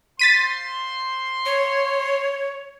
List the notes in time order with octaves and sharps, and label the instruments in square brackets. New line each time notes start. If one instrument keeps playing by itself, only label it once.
[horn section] C5 F5 C6 [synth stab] A6 B6 D#7
[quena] C#5